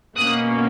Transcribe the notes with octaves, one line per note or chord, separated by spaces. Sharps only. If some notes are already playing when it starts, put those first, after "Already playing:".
B2 A#3 C#4 D#6 F#6